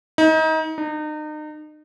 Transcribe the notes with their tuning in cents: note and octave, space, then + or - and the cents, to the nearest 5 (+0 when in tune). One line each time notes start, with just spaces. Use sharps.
D#4 +30
D#4 -35